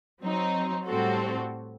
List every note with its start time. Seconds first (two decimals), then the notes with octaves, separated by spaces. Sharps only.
0.22 F#3 C4 D#4
0.85 A2 G3 C4 F#4 A4